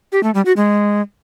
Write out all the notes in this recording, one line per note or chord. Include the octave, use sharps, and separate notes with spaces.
G4
A3
G3
F#4
G#3